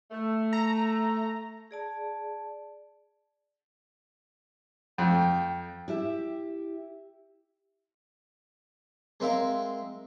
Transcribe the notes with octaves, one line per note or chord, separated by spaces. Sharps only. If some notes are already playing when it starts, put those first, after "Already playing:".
A3
A#5
G#4 D5 A5
F2 G5
E4 G4 E5
G#3 C4 A#4 E5 F5